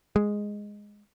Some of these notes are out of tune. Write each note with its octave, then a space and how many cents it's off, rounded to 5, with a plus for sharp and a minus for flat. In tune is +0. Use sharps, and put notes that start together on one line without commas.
G#3 -5